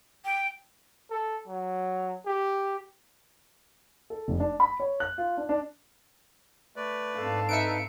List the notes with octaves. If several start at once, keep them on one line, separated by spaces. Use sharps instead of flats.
G5
A4
F#3
G4
A4
F1
D4
B5
C#5
F#6
F4
D4
D4
A3 B4 D5
G#2 C4 D4 A4 F5
D#4 B4 E5 C#7 D7